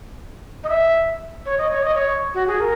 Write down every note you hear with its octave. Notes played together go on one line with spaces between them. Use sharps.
D#5
E5
C#5
D#5
C#5
D#5
C#5
F#4
G#4
A#4